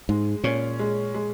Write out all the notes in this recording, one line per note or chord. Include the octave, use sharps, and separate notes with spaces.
G#2 G#3
A#2 C#4
G#3
G#3